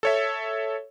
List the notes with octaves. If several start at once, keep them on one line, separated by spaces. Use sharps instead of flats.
A4 C#5 E5